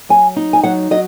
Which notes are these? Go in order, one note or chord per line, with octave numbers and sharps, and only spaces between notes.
F#3 G#5
D#4
G#5
F#3 F#5
F#3 D#5